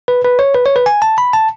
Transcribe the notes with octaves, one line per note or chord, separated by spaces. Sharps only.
B4
B4
C#5
B4
C#5
B4
G#5
A5
B5
A5